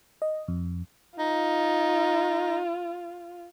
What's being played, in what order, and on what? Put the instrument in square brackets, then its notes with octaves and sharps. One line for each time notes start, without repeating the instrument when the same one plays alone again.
[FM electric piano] D#5
F2
[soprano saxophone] D#4 [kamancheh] F4